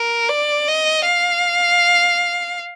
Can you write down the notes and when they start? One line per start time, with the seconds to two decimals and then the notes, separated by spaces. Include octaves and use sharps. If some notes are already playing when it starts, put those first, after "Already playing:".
Already playing: A#4
0.29 D5
0.68 D#5
1.06 F5